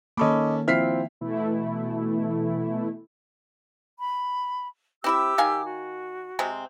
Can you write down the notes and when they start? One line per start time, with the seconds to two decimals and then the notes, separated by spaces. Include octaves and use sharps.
0.17 D#3 A#3 C#4 A4 D#5 B5 C#6 D6
0.68 F3 C4 E4 E5 F6 B6 C7
1.21 B2 E3 A3 E4
3.98 B5
5.04 C4 E4 G4 E5 D6 E6
5.38 D#3 F5 G#5
5.64 F#4
6.39 C3 G#3 C4